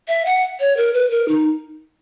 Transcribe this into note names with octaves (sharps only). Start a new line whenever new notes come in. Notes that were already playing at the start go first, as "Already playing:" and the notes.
E5
F#5
C#5
A#4
B4
A#4
D#4